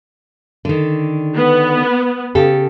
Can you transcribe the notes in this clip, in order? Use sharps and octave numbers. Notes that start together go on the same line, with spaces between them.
D3 D#3
B3
C#3 G4 A4